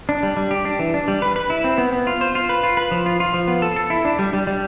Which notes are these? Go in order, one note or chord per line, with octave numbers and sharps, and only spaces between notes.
D4
G3
G3
G4
D4
E3
D4
G3
B4
B4
E4
C4
B3
B3
F4
C5
F4
B4
F4
B4
F3
F4
F4
F3
B3
A4
A4
E4
D4
G3
G3
G3